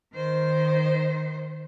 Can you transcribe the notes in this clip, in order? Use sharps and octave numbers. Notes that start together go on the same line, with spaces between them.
D#3 C5